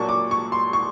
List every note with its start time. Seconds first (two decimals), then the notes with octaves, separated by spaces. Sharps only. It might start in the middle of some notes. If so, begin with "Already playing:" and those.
Already playing: A#2 F#3 A#3 D4 C#6
0.09 D6
0.31 C#6
0.52 C6
0.73 C#6